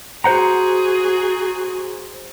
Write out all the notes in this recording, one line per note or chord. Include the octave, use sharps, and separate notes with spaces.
F#4 G#4 C5 F#5 A#5